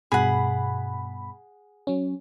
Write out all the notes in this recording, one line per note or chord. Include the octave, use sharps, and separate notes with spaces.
G2 B2 G#4 F#5 B5
F#3 C#4